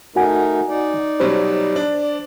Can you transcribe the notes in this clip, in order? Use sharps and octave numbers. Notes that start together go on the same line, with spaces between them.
A3 D#4 F#4 A#4 F#5 G#5
D#4 D5
B2 F#3 G3 C5
D4
D5